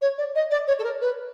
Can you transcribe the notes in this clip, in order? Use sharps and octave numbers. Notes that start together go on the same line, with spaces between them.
C#5
D5
D#5
D5
C#5
A4
A#4
B4